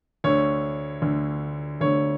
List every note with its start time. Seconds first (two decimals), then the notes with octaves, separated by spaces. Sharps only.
0.24 D2 D3 C#5
1.02 D2 D3
1.81 D2 D3 C#5